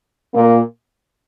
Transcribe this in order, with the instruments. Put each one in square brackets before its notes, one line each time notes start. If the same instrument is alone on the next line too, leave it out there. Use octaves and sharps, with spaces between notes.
[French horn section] A#2 A#3